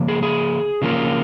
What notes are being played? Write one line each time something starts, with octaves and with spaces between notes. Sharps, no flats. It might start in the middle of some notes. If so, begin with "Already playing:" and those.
Already playing: C#3 F3 A#3
G#4
G#4
C#3 F3 A#3 F4